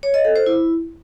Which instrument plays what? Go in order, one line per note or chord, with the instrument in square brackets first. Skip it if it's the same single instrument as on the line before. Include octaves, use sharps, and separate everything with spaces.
[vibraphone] C#5
D#5
A4
C5
E4